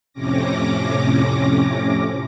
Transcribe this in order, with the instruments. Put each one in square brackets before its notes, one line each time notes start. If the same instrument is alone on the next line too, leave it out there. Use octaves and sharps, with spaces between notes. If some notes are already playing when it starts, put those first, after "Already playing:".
[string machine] F2 A2 C3 C#4 D6 A#6